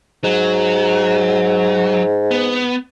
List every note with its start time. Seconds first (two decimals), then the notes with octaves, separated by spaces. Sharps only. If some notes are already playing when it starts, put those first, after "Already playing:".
0.24 G#2 F#3
2.31 B3